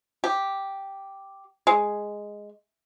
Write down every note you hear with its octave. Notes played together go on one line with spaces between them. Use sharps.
G4
G#3